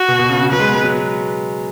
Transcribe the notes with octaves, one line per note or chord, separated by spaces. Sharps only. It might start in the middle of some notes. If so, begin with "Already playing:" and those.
Already playing: F#4
B2
B2
C#3
C#3
F#3 B4
G#3
B3
G#3
F#3